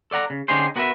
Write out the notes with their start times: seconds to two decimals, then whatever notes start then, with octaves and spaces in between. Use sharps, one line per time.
0.11 A4 D5 F#5 A#5
0.30 C#3
0.48 D3 C#4 D#4 G4 G#4 C5
0.76 B3 F#4 A#4 B4 D#5 E5